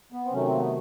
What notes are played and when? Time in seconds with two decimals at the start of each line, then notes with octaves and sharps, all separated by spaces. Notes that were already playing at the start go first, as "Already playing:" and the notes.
0.12 B3
0.25 C4
0.32 C3 D#3 F#3 A3 C#4
0.46 C4
0.54 A#3
0.59 B3